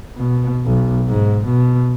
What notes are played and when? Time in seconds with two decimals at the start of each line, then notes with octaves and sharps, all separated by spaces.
0.18 B2
0.66 B1
1.08 G#2
1.46 B2